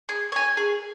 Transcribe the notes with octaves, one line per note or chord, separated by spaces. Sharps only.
G#4
C#5 G#5
G#4